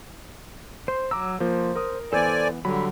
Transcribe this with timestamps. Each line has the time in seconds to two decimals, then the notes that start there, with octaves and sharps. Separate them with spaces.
0.88 C5 C6
1.11 F#3 A#5 D6 E6
1.40 F3 A#3 C5
1.75 A#4 D#6
2.13 E3 B3 A4 C5 D5 G#5
2.65 D3 F#3 G3 B5